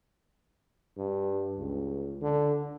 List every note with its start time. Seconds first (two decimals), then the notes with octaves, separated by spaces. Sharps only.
0.98 G2
1.59 C#2
2.22 D3